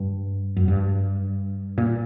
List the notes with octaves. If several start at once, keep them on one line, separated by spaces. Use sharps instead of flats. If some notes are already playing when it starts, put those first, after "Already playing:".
Already playing: G2
F#2
G2
A#2